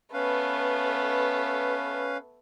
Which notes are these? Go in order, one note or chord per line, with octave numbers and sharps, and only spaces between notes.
A3 B3 C#4 B4 F5